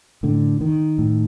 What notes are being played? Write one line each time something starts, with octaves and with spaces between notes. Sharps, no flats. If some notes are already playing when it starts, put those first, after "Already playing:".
A2 D3
D#3
A2